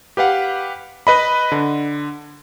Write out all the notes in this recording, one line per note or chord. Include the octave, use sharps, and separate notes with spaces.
G4 B4 F5 F#5
B4 D#5 B5
D3